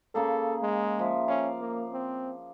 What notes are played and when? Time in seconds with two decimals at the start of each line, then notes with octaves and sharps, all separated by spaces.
0.15 C#3 A#3 G#4 A4
0.62 G#3
0.99 F3 E5
1.28 C#4 D5 F5
1.61 A#3
1.93 C4